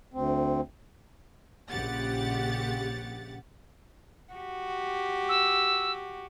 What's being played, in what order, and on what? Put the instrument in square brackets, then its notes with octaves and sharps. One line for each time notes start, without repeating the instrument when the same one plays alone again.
[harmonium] D2 C4
[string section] A#1 C#3 G4 F#5 A6
[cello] F#4 G4
[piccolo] E6